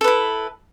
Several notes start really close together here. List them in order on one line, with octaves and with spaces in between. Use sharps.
A4 B4 E4